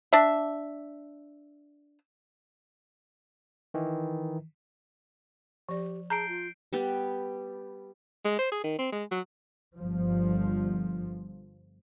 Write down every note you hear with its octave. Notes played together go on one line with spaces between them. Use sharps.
D4 E5
D#3 E3
F3 G4 D5
G#4 A5 A#5 G6 C7 D7
F4
G3 B3 G4
G#3
C5
G#4
D#3
C4
G#3
F#3
G1 F3